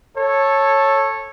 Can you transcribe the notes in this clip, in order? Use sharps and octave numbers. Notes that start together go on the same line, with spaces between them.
A4 C#5